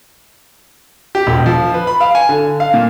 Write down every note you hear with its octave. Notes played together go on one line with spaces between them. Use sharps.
G4
E1
F3
B4
B5
F5
G#5
D3
F5
A#2